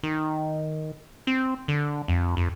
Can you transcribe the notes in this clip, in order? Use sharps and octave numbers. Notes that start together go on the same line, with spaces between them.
D#3
C4
D3
F2
F2